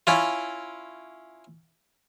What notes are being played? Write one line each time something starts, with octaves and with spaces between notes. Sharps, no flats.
C#4 E4 F4